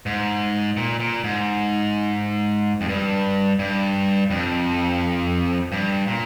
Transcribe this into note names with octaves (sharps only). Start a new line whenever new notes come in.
G#2
A#2
A#2
G#2
F2
G2
G2
F2
G2
A#2